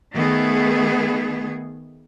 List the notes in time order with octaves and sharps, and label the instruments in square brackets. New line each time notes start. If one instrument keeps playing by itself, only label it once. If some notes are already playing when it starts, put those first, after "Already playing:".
[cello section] D#3 A3 B3 G#4